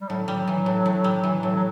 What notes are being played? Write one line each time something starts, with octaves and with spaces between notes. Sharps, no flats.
G3
A2 F#3
G3
E3
A2
A2
G3
E3
A2
F#3